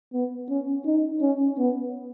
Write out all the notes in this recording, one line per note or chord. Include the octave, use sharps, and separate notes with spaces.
B3
C#4
D#4
C#4
B3